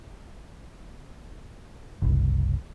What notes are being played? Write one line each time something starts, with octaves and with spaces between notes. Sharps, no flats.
F#1 C2